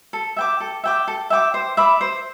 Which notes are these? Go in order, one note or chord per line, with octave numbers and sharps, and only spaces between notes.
A4
E5 G5 D6
A4
E5 G5 D6
A4
E5 G5 D6
C5
E5 B5 D6
C5